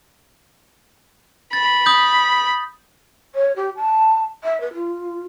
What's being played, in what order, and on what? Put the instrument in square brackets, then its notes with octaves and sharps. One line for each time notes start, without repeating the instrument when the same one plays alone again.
[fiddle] B5 [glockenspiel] A6
[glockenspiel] D#6 G6
[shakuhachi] C#5
G4
A5
E5
B4
F4